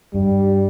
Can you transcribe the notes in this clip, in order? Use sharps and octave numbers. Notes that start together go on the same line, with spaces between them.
G2 G3